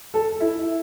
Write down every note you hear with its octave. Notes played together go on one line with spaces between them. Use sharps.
A4
E4